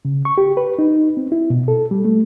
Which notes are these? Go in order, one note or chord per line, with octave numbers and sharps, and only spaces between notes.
C#3
C#6
G4
B4
D#4
C4
E4
B2
A4
G3
A3